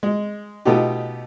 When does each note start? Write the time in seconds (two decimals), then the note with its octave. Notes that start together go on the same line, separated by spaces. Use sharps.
0.03 G#3
0.65 B2 A3 B3 D#4 F4 G4